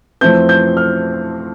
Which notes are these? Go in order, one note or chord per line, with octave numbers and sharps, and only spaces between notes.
F2 E3 A3 C4 G6
G6
F6